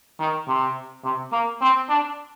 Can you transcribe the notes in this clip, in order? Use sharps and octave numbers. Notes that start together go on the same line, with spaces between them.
D#3
C3
C3
A#3
C4
D4